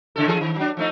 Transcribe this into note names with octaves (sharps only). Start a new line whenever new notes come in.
A2 C#3 A4
E3 G#4 A4
D#3
F#3 D4
F3 A3 D#4